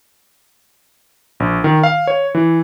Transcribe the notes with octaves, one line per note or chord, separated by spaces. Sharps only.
A#1
D#3
F5
C#5
E3